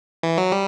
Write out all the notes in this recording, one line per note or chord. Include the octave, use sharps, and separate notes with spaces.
E3
F#3
G3